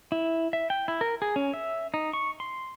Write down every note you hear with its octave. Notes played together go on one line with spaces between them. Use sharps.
E4
E5
G5
E4
A#4
G#4
C#4
E5
D#4
C#6
C6